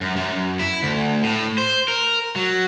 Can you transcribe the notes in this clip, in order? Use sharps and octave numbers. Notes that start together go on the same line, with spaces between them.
F#2
F#2
E4
D2
A2
C5
A#4
F#3